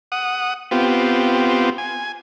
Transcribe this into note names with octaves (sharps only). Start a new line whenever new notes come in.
F#5 D#6
B3 C4 F4 G4
G#5